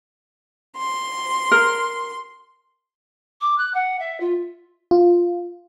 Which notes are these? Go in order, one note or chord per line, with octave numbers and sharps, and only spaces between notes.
C6
A#4
D6
F#6
F#5
E5
F4
F4